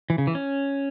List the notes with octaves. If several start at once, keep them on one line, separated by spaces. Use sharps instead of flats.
E3
C#3
E3
C#4